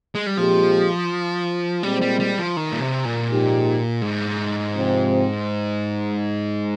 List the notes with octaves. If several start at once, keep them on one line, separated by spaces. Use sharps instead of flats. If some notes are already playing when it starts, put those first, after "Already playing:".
G#3
G3
A#2 F3 G#3 C4 G4
A#2 G3 G#3 C4
G3
G3
F3
D#3
A#2
C3
A#2
G#2 F3 G#3 D#4 G4
G#2
C3 F3 C4